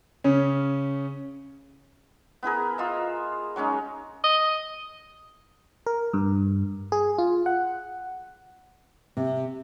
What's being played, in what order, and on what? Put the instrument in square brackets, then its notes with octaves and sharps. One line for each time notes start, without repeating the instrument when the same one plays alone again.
[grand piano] C#3 C#4
[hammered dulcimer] B3 E4 G#4 A#4
F4 D#5 E5
F#3 G#3 C#4 D#4
[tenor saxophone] D#5
[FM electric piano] A#4
G2
G#4
F4
F#5
[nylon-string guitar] C3